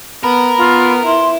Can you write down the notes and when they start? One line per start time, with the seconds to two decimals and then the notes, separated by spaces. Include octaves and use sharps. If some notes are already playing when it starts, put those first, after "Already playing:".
0.23 B3 A#4 B5
0.58 B3 F4
1.06 E4 C6